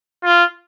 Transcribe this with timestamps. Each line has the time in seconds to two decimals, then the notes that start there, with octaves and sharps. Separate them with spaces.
0.24 F4